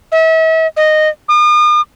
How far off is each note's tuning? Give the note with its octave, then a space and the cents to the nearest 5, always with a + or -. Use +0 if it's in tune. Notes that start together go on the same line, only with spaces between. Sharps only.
E5 -40
D#5 -10
D#6 -45